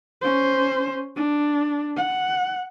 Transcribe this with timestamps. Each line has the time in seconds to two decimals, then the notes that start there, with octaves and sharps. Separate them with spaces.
0.22 C#4 C5
1.16 D4
1.97 F#5